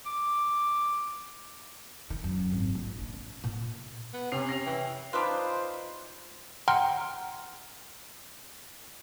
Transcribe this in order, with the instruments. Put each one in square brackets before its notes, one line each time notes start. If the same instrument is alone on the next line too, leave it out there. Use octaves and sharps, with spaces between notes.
[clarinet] D6
[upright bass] D#3
F#2
G#1
A#1
D4
A#2
[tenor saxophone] B3
[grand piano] C3 C7 F7 [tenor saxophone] C#4
[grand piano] A#6 C7 F7
[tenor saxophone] E3 [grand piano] G5
[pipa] D4 D#4 B4 [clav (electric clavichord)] F4 [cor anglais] C5
[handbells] F#5 G5 A#5 C6 F6